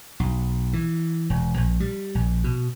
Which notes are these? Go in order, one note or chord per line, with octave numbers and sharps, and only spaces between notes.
B1
E3
E1
A#1
G3
A#1
B2